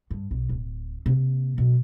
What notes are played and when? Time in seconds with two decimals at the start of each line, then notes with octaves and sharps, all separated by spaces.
0.11 G2
0.31 B1
0.49 D1
1.06 C3 A#3
1.58 B2 F#3